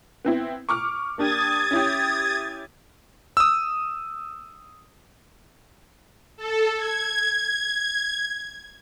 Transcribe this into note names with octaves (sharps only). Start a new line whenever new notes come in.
B3 C4 E4
C#6 D6 F6
A#3 D4 G4 D#6 G#6 A6
C#4 E4 G4
D#6 E6
A4
G#6